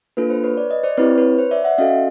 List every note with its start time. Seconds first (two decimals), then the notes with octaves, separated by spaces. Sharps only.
0.17 A#3 D4 F4 A4 B4
0.30 C5
0.44 B4 C#5
0.57 D5
0.71 D#5
0.83 C5 D5
0.98 C4 E4 G4 B4 C#5
1.18 B4 C#5
1.38 C5
1.51 D5 E5
1.64 E5 F#5
1.78 C#4 F#4 A4 D#5 F5